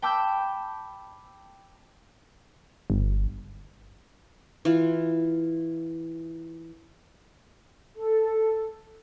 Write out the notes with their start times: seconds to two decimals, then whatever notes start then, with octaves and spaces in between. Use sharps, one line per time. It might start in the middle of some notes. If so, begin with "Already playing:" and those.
0.02 G5 A5 B5 D6 E6 G6
2.90 G1
4.65 E3 F4
7.95 A4